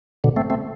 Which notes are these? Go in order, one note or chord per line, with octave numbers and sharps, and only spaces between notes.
B2 D3
A3 C4
A3 C4